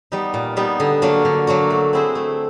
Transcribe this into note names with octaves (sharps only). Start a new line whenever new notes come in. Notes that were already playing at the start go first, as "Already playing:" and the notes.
G3 B3 D#4
A#2
G3 B3 D#4
D3
F#3 A#3 D4 F#4
D3
F#3 A#3 D4 F#4
A3
C4 E4 G#4 C5
A3